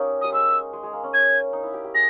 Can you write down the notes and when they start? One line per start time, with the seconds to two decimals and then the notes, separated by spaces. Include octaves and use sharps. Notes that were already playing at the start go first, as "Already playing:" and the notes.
Already playing: A#3 C#4 D#4 G4
0.21 G3 D#6
0.32 G#3 E6
0.73 G#3
0.83 G#3
0.93 A#3
1.04 C#4
1.13 G#6
1.53 D#4
1.63 E4
1.74 G4
1.84 G4
1.94 G#4 A#6